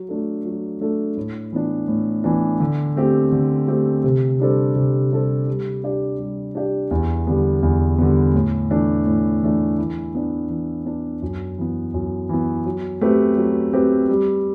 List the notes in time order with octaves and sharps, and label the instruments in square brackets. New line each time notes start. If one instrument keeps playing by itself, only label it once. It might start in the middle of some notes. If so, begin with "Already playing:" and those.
Already playing: [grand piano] F#3
A3 D4 A4
F#3
A3 D4 A4
A2
E3 B3 D4
A2
E3 B3 D4
D3
A3 C4 G4
D3
A3 C4 G4
C3
G3 D4 A4 C5
C3
G3 D4 A4 C5
G3
D4 G4 D5
G3
D4 G4 D5
E2
D3 G3 B3
E2
D3 G3 B3
A2
E3 A3 D4
A2
E3 A3 D4
E3
B3 D4
E3
B3 D4
F#2
E3 B3
F#2
E3 B3
F#3
A3 C4 G4 B4
F#3
A3 C4 G4 B4
G3